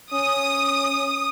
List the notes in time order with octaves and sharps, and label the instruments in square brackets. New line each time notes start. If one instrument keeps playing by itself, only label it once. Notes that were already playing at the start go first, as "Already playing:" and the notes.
[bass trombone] C#4 [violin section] D#6